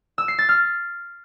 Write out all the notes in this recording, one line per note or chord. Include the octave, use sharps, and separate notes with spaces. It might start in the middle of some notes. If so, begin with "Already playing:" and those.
E6
C7
A6
F6